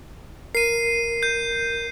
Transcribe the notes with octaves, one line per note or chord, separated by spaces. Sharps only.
A#4 C7 D#7
G6